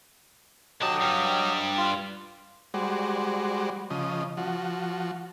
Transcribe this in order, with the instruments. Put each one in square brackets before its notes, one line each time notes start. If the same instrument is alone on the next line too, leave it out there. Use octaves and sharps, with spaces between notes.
[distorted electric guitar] D3 A5 [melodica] F#3 G4 D#5
[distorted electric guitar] G2 G3
[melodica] F4
[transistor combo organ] G3 G#3 F#4 C5 D5
C#3 F3 D#5
F3 F#4